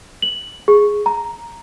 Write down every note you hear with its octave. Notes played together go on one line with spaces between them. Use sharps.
F#7
G#4
A#5